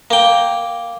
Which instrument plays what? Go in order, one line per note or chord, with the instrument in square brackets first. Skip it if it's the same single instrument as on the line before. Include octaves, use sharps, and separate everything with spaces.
[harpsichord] A#3 G5